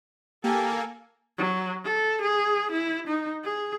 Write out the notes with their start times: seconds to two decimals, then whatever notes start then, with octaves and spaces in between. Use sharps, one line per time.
0.44 A#3 G4 A4 G#5
1.38 F#3
1.85 A4
2.22 G#4
2.72 E4
3.07 D#4
3.44 G#4